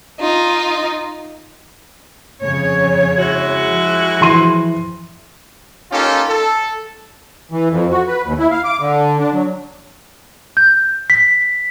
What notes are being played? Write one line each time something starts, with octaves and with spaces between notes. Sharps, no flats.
D#4 F4
F2 C#3 C#5
G#3 E4 F#4
F3
E3 C6 D#7
A#3 C#4 D#4 F4 G4 A4
A4
E3
F2
F#4
B4
D#2
E4
F5
D6
D3
D4
F#3
G6
B6